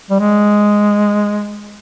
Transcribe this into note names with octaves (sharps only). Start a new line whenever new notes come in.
G3
G#3